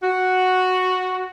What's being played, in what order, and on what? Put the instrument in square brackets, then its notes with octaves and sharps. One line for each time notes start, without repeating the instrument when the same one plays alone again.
[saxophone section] F#4